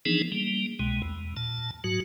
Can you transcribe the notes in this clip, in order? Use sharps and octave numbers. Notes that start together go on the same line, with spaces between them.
E3 F3 B3 D4 D#4 G#4
G3 A#3
C2 B2 G#3
E2
A#2 A5
G#2 F#3 F#4